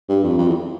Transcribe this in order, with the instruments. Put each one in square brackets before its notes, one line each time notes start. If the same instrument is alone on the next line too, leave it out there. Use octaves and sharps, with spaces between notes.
[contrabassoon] G2
F2
F2
E2